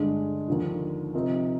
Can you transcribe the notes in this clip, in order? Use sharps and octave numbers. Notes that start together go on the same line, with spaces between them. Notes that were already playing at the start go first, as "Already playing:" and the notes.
Already playing: G2 D3 G#3 D4 G#4
D#2 D3 F3
C3 F3 C4 D#4 A#4